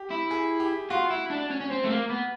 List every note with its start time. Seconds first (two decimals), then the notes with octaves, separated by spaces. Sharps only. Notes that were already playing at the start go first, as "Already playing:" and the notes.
Already playing: G4
0.11 E4
0.31 G#4
0.60 G4
0.90 F4 F#4
1.10 E4
1.30 D4
1.51 C#4
1.61 C#4
1.71 C4
1.85 A3
1.90 A#3
2.10 B3